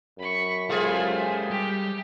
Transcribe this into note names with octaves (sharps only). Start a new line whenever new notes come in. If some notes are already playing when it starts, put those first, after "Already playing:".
F#2 B5 C#6
G#3 A3 F4 G4 G#4 C5 G#5
G3 G4